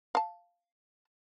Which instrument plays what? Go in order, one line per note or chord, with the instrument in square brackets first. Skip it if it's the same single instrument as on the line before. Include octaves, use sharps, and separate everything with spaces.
[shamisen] F5 A5